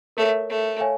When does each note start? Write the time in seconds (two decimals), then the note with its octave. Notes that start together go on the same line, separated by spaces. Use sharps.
0.17 A3 A#4 C#5 E5
0.49 A3
0.80 C#5 F5 G#5